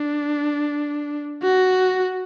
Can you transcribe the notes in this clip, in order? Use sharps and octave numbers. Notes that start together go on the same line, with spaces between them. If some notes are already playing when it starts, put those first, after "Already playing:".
Already playing: D4
F#4